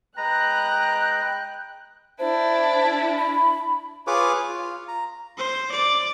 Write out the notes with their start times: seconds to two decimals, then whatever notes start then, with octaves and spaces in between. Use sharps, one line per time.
0.17 G#3 B4 G5 A#5 F#6
2.19 D4 E4 C5
3.18 B5
4.07 F4 G#4 B4 C#5 D6
4.49 F4
4.88 A#5
5.37 C5
5.72 D5